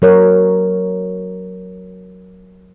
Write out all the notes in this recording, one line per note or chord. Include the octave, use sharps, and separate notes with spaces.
F#3 A#4 C#5